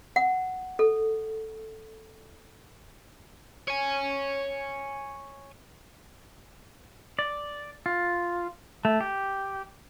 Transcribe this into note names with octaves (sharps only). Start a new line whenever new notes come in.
F#5
A4
C#5 G#5
D5
F4
A3
G4